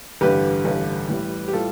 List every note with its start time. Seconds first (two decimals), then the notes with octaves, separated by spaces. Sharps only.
0.21 A1 G2 D3 G4 B4
0.65 A1 G2 D3
1.09 A1 A2 G3
1.48 G4
1.53 A2 G3 F4 A4